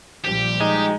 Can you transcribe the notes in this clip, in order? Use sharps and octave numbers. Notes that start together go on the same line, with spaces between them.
A#1 F3 G3 G4
G#3 D#4